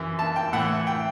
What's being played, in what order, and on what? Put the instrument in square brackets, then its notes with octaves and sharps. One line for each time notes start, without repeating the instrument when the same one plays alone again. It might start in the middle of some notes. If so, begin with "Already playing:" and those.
Already playing: [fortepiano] F#2 E3
A5
G5
A2 E3 F#5
G5